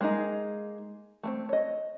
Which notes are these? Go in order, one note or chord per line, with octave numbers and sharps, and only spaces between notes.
G#3 A#3 C#4 D#4 G#4
A3 A#3 C4
C#5 D#5